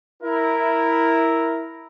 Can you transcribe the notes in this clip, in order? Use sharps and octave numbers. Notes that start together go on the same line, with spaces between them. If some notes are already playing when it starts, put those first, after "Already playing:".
E4 A#4